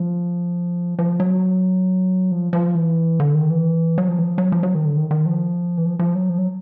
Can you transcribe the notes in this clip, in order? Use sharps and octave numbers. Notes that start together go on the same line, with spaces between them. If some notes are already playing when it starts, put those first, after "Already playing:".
Already playing: F3
F3
F#3
F3
F3
E3
D3
D#3
E3
F#3
F3
E3
F3
F#3
F3
F#3
D#3
D3
D#3
D#3
F3
E3
F3
F3
F#3
F3
F#3